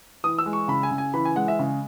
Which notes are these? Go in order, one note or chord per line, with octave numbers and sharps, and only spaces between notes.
E3 D#6
E6
G#3
C#6
C#3 B5
G#5
C#3
G#5
E3 B5
G#5
G#3 F#5
E5
C#3